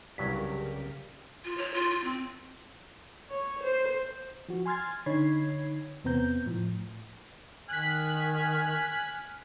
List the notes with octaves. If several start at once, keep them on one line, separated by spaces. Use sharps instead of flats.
C2 G2 C#3 F#3 G4 A#4 B6
F4
C#5
F4
F4
C4
C#5
C5
F3 F#4
G#5 C6 F6 G#6 A6
D3 D#4 C#5 B5 G#6 C7
E2 C3 B3 C4 A#5 G6
A2 F3
D#3 G#5 F6 F#6 B6